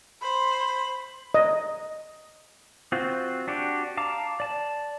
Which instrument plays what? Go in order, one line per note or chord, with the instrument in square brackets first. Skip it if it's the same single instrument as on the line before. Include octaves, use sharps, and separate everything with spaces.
[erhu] C5 [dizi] B5
[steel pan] D#5
[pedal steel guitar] C4 F4 F#4
D4 F#4 G4
F5 A5 A#5 D6
D5 A5